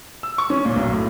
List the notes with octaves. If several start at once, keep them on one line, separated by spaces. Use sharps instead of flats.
E6
C#6
C#4
A#2
B1
A2